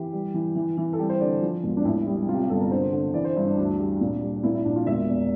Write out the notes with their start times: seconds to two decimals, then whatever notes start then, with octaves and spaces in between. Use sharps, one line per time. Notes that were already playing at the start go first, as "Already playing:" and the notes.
Already playing: E3 G4
0.13 G3
0.34 E3
0.56 E3
0.77 E3
0.93 A4
0.99 G3 G4
1.09 C5
1.20 D3 D5
1.42 F3
1.64 E1
1.77 D4
1.85 A1 E4
2.06 G3 E4
2.28 C3 F4
2.34 G4
2.39 F4
2.49 G1 A4
2.61 A#4
2.71 D3 C5
2.93 D3
3.14 E3 D5
3.24 C5
3.36 G2 E4
3.46 D4
3.57 D2 D4
3.79 G3
4.01 A#2
4.22 G3
4.43 A#2 E4
4.54 E4
4.65 A#1 D4
4.76 F4
4.86 E1 E5
5.08 E2